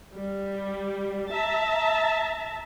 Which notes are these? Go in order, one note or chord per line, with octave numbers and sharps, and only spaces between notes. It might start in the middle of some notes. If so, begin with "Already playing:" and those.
G3
E5 A5 A#5